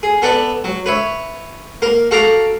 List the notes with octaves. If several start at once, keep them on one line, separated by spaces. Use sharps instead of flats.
G#4
B3 A4 B4 D5
F#3
B4 C#5 E5
A#3 A#4
F#4 A4 F5 A#5 D6